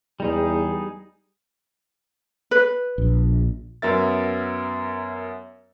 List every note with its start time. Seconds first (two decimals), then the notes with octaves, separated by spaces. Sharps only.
0.20 E2 G3 D#4 G#4
2.51 B4
2.98 A#1
3.82 F#2 B3 A#4 E5 A6